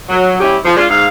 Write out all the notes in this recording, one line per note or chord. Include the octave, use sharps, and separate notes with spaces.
F#3
G3 C#4 E4 G4
F3
G#3 D4 F4
G#2 F5